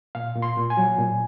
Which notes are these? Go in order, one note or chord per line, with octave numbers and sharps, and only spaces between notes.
A#2 F5
A#2
C6
A#2
G#5
F#3
A#2